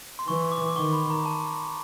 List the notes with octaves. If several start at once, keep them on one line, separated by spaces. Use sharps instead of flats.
C6
E3 C#6
D6
D6
D#3 C#6
B5
A#5
A5